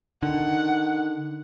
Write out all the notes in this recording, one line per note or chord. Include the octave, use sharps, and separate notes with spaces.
D3 D#3 F#5